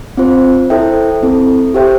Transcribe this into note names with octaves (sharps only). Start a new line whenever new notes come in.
C4 F4 C5
E4 A4 C5 E5 G5
C4 E4 A4
G4 C5 E5 G5